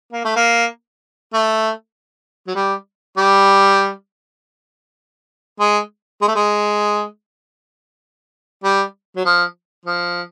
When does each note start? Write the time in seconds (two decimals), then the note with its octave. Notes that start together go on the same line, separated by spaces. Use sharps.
0.12 A#3
0.25 A3
0.36 A#3
1.33 A3
2.47 F#3
2.55 G3
3.17 G3
5.60 G#3
6.21 G#3
6.28 A3
6.35 G#3
8.64 G3
9.16 F#3
9.25 F3
9.85 F3